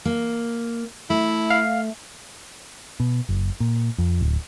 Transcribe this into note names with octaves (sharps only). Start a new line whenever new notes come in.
A#3
A3 E4
F5
B2
F#1
A#2
F2
D1